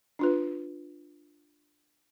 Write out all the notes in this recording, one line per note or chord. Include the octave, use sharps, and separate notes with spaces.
D4 F4 B4